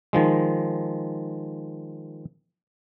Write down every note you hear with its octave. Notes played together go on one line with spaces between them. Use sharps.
D#3 F3 G#3